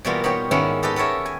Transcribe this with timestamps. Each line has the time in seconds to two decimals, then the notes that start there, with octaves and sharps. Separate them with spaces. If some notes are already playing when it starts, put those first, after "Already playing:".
0.05 B2 E3 G3 A#3 B3 F4
0.24 B3 D#4 C#5 G5
0.51 G#2 D#3 B3 C#4 D#4 E4
0.83 G4 A4 B4 D#5
0.96 B3 A4 A#4 C#5 E5
1.26 G#5